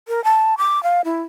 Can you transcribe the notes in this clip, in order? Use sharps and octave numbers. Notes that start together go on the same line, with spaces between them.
A#4
A5
D6
F5
E4